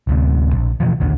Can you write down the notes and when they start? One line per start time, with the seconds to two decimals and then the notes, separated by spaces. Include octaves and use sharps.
0.07 D1 D2 C3
0.53 A#1
0.80 B2 E3 F3
1.00 A#1 D#2 D3